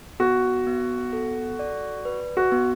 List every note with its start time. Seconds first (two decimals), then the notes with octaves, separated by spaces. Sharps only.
0.20 B3 F#4
0.67 B3
1.13 A4
1.59 D5
2.05 B4
2.37 F#4
2.52 B3